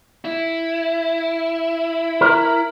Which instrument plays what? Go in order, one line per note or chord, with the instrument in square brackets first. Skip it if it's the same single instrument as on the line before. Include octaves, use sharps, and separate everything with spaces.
[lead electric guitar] E4
[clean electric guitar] A#4